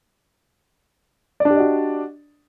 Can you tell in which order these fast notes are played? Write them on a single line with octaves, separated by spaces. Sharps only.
D5 D4 G4 D#5 F#4